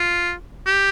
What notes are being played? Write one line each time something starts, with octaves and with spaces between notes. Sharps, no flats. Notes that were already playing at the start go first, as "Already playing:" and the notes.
Already playing: F4
G4